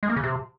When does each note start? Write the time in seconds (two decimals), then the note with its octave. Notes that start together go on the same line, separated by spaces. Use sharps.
0.03 G#3
0.10 A#3
0.16 C#3
0.23 C3